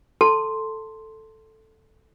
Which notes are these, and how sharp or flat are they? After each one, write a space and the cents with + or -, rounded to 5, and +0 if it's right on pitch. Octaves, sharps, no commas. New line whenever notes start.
A4 +0 A5 +25 C6 +0